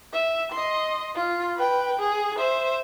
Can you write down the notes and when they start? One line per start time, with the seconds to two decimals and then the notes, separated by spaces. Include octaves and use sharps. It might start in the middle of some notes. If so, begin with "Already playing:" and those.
0.14 E5
0.52 D#5 C6
1.16 F4
1.57 B4 G5
1.99 G#4
2.38 C5 E5